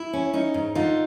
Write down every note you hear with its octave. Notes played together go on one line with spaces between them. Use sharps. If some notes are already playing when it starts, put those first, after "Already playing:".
Already playing: E4
C#4
C#4 D#4
G#2
D3 D#4 F4